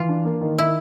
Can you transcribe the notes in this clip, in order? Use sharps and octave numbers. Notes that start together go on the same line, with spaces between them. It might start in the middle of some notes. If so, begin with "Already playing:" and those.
Already playing: E3 F4
D4
A#3
D#3
D#3 E4